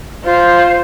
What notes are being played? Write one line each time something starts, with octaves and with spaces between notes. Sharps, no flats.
F4 C5